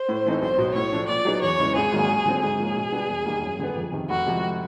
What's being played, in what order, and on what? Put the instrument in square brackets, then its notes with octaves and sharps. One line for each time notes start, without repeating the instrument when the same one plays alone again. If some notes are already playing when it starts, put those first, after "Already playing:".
Already playing: [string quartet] C5
[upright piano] A2
E3 A3 C4 D#4
[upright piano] B1 [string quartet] C5
[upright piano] B2 F#3
[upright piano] A2 [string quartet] C#5
[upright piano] F3 A3 D4
[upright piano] A#2 [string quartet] D5
[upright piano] F#3 B3 D#4 G#4
[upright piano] E2 [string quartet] C#5
[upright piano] C#3 E3 G#3
[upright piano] G#1 [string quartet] G#4
[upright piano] G#2 D#3 F#3 A#3
D#2
D3 F#3 A3 C4
[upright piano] G#2 [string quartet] G#4
[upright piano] F3 A#3 C#4
B2
G3 B3 D4
E1
D#2 D#3 G3 A#3
F#2
D3 G3 B3
F2
C3 D#3
[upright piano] F1 [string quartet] F#4
[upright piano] F2 C3 F3 G#3